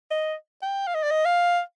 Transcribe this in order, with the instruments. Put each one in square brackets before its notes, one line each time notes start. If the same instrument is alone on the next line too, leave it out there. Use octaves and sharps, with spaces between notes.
[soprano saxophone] D#5
G5
F5
D#5
D5
D#5
F5